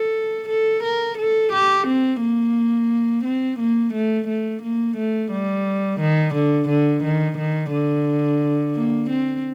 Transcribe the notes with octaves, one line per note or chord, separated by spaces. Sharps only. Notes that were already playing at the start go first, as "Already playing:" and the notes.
Already playing: A4
A4
A#4
A4
G4
C4
A#3
C4
A#3
A3
A3
A#3
A3
G3
D#3
D3
D3
D#3
D#3
D3
A#3
C4